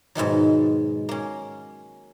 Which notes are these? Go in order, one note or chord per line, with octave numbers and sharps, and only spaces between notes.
G#2 B2 D#3 F#3
A#3 C#4